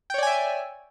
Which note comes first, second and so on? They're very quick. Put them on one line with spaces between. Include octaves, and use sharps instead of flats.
G5 C#5 D5 G#5 E5